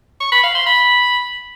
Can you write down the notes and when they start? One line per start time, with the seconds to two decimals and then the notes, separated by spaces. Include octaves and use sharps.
0.20 C#6
0.32 B5
0.43 F5
0.55 C6
0.66 B5